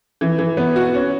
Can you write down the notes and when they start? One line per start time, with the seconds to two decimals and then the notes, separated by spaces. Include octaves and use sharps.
0.21 E3
0.38 E3
0.57 B3
0.76 F#4
0.95 C#4